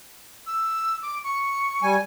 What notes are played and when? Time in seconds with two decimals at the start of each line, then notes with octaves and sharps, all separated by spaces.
0.46 E6
1.02 D6
1.24 C#6
1.83 G3 G#5